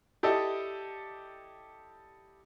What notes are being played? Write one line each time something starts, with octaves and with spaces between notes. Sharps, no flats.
E4 G4 A4 D5 D#5